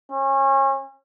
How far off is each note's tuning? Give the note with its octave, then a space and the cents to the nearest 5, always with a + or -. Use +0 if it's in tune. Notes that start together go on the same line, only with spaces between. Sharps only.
C#4 -30